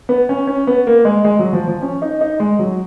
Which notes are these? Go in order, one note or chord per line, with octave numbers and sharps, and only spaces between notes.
B3
C#4
C#4
B3
A#3
G#3
G#3
F#3
F3
F3
C#4
D#4
D#4
G#3
F#3